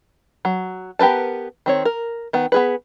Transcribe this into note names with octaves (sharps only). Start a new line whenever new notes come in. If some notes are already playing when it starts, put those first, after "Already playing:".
F#3
B3 G4 A#4 B4 A5
D#3 C4 C#5
A#4
D#3 B3
B3 G#4 B4